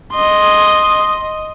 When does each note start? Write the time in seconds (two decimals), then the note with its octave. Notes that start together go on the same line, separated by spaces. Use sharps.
0.14 D#5 C6